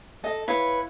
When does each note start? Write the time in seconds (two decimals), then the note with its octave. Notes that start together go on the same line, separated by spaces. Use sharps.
0.24 A4 D#5
0.48 E4 B4 C#5 F5